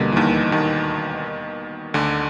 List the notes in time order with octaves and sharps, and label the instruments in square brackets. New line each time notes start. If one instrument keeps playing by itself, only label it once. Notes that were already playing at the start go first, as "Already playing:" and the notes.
Already playing: [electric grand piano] D2 D3 [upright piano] B2 G3 A#3
[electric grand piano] E3
D#2 D#3
D#2 D#3
D2 D3